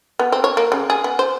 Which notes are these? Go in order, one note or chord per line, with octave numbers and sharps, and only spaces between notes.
B3
C4
C#5
A#3
C#3
G#4
B3
C5